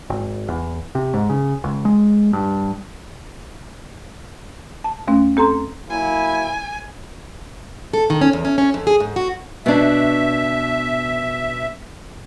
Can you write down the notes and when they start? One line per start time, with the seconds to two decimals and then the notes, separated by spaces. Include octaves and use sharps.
0.10 G#1
0.48 E2
0.95 C3
1.14 G#2
1.29 C#3
1.64 C#2
1.85 G#3
2.33 G2
4.84 A5
5.07 D#2 A3 C#4
5.37 C4 A4 A#5 C6
5.90 F#3 A#3 E4 G#5
7.93 A4
8.10 D#3
8.21 C#4
8.33 E2
8.45 C#4
8.58 C#4
8.74 F2
8.87 G#4
9.00 G#2
9.16 F#4
9.66 B2 D4 E5